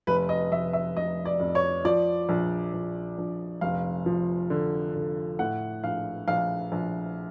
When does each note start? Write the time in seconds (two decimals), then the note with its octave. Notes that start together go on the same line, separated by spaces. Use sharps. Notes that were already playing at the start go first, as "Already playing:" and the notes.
0.07 F1 B4
0.29 D#5
0.51 F1 E5
0.73 E5
0.96 F1 D#5
1.25 D5
1.40 F2
1.55 C#5
1.85 F3 D5
2.29 A#1
2.74 A#1
3.18 A#1
3.61 F1 F5
4.06 F3
4.50 D3
4.95 D3
5.39 A2 F#5
5.84 A#1 F5
6.28 A#1 F5
6.72 A#1